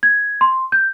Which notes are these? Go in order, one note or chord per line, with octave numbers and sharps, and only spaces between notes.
G#6
C6
G6